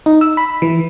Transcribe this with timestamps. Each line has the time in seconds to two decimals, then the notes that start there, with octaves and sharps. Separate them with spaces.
0.06 D#4
0.21 E6
0.37 B5
0.62 E3